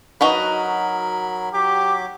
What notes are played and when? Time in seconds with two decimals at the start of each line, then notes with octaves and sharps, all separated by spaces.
0.21 F#3 D#4 F#4 A#4 B4 B5
1.54 F#3 G4 D6